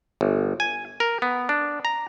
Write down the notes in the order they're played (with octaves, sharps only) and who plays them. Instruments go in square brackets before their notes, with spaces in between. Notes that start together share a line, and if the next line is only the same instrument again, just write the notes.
[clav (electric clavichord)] G1
G#5
A#4
B3
D4
A#5